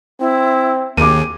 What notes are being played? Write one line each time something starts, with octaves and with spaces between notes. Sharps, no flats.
C4 E4
D#2 G#4 D6 D#7